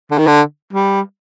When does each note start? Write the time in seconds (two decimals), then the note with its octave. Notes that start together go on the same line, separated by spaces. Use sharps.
0.11 D3
0.19 D#3
0.27 D3
0.73 G3